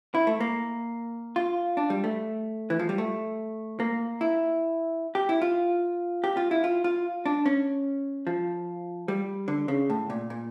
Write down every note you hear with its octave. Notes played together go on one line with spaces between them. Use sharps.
E4
A3
A#3
F4
D4
G3
A3
E3
F3
G3
A3
A#3
E4
G4
E4
F4
G4
F4
E4
F4
F4
D4
C#4
F3
G3
D3
C#3
A2
A#2
A#2